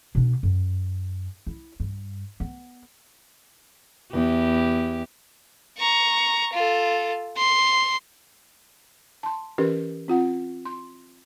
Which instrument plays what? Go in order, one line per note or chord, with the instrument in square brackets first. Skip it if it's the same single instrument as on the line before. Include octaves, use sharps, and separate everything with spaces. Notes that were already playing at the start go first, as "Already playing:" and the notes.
[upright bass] B2 D4
F#2
E4
G2
B3
[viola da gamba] E2 G4
[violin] A#5 C#6
F4 A4
C6
[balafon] A5 C6
E3 C#4 G4 A#4 B4
C4 F4 F#5
C6